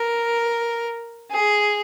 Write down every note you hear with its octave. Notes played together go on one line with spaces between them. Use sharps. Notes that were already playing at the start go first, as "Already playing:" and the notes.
Already playing: A#4
G#4